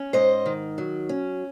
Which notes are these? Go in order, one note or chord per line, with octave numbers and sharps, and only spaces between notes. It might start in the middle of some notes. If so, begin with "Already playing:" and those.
Already playing: C#4
G#2 C5 D#5
D#3
F#3
C#4